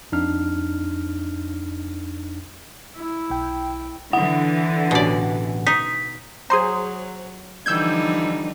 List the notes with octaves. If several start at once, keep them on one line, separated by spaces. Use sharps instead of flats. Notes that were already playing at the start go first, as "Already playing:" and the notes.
F2 D4 D#4 F6
E4
B1 G5
D3 E3 E4 F#5
A1 B2 C#4 D5
D#4 B6
F#3 G#4 C5 A#5 C6 D#6
D3 E3 F3 G3 D#4 E6 G6 G#6